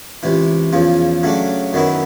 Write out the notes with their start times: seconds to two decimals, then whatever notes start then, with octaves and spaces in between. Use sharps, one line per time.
0.23 C#2 C3 E3
0.73 E2 C#3 F3
1.23 C#3 F#3 A3 D4
1.73 F#2 D#3 F#3 B3 E4